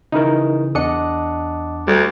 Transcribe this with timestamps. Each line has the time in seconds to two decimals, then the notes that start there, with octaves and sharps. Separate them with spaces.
0.12 C#3 E3 D#4 E4 A#4
0.75 E2 D4 D#5 F#5 D#6 C#7
1.87 D2 G3